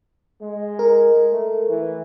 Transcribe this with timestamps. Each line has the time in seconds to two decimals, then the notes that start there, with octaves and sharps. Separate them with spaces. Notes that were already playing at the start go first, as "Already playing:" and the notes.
0.41 G#3
0.79 A#4
1.32 A3
1.69 E3